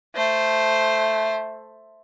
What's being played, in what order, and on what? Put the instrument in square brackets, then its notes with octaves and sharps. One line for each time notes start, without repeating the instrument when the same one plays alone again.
[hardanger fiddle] A3 C5